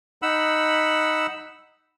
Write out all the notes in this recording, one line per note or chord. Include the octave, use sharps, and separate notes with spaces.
D#4 F#5 B5 E6